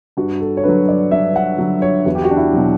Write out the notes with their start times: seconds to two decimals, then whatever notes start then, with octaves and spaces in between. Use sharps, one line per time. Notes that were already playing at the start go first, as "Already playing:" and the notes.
0.17 G2 F#4
0.40 A4
0.57 C#5
0.64 D3 F#3 B4
0.88 D5
1.11 G2 E5
1.36 F#5
1.58 D3 F#3
1.82 C#5
2.05 E2 F#4
2.15 G4
2.24 F#4
2.31 D4
2.37 E4
2.53 B2 F#3